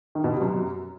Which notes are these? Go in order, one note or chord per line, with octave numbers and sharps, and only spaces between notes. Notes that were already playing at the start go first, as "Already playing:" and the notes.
D#3
B2
C3
F#2